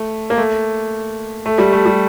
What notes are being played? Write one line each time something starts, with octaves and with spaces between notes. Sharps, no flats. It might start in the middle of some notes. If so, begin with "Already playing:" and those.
Already playing: A3
A#3
A3
A3
G3
A3
G3